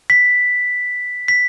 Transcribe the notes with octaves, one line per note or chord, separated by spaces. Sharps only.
B6
B6